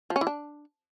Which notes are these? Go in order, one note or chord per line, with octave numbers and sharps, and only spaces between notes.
F3
C#4
E3
D4